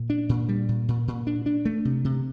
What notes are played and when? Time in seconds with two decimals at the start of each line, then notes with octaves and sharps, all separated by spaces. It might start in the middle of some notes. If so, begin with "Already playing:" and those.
Already playing: A#2
0.10 D4
0.29 A#2
0.49 G3
0.69 A#2
0.88 A#2
1.08 A#2
1.27 D4
1.46 D4
1.65 A3
1.85 C3
2.05 C3